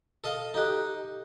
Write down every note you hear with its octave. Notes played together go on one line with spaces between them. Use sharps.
A4 D#5 F5
D#4 G4 A4 D#5 F#6